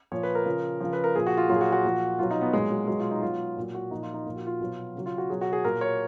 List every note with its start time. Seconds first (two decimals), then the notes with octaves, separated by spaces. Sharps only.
0.12 A#2 F3 C#5
0.23 B4
0.35 A#4
0.46 C#3 F3
0.80 C#3 F3
0.93 B4
1.04 A#4
1.15 A#2 F3 G#4
1.27 F#4
1.37 F4
1.49 A#2 F#3 F4
1.56 G#4
1.61 F#4
1.73 F#4
1.84 A#2 F3
2.19 B2 F#3 F4
2.31 D#4
2.41 B3
2.53 A#2 F#3 G#3
2.70 F#3
2.88 B2 F#3 G#3
2.99 F4
3.11 D#4
3.22 B2 F#3 F4
3.57 A#2 F#3
3.75 F#4
3.91 A#2 F3 D#4
4.03 F4
4.14 D#4
4.25 A#2 F3 F4
4.36 F#4
4.47 F4
4.60 B2 F#3
4.95 C#3 F#3
5.06 F4
5.18 F#4
5.30 B2 F#3 G#4
5.41 F#4
5.53 G#4
5.64 A#2 F#3 A#4
5.81 C#5